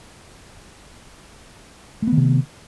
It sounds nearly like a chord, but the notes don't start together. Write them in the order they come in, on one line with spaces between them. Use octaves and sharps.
A3 B3 D#3 C3